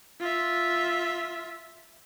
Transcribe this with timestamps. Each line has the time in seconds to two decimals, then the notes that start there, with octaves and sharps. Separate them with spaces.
0.20 F4 E5